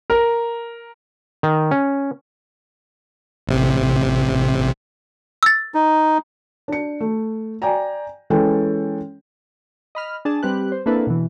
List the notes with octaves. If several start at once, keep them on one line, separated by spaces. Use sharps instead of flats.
A#4
D#3
C#4
A1 C3
E6 A6
D#4
D4 C#7
A3
D5 G5 G#5 A#5
E3 G#3 C#4 A4 G5
D#5 B5 F6
D4 G#4 A5
G3 C4 G4 B4 F#6
C5
A#3 C4 D4 E4 A4 B4
B2 E3